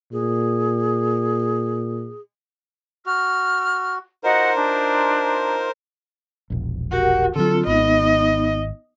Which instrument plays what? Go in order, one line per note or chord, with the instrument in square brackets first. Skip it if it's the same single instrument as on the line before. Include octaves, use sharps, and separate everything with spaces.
[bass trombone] A#2 [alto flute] G#4
[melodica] F#4 [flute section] F6
[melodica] D#4 F4 [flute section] F#4 D#5 F#5 [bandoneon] A#4 C5
[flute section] D4
[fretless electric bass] E1 A#1
[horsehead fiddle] F#4 [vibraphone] G4 A#4 F#5
[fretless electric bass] D3 D#3 F#3 [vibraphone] C4 F4 [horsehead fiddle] A4
[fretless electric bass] G#1 [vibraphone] B3 D#4 [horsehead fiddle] D#5